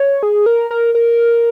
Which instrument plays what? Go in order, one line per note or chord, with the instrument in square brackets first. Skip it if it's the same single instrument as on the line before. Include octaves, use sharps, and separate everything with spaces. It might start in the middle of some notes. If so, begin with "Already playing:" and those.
Already playing: [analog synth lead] C#5
G#4
A#4
A#4
A#4